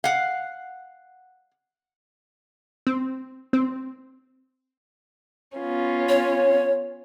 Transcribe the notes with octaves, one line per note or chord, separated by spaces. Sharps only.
F5 F#5
C4
C4
B3 C#4 F4
C#5